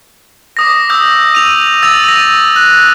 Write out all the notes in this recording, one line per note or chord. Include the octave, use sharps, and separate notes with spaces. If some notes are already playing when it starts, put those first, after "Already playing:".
D6 D#6 A#6
D#6 E6 G6
D#7 F7
E6 A6 F7
A#6 D#7
F#6